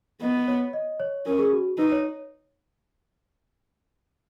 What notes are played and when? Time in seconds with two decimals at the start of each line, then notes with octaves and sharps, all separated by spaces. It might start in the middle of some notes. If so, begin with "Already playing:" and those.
0.21 B3 D#5
0.48 C#5
0.73 D#5
1.00 C#5
1.26 C#4 A#4
1.39 G#4
1.52 F#4
1.78 D#4 B4
1.92 C#5